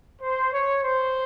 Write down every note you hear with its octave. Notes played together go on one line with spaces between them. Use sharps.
C5
C#5
C5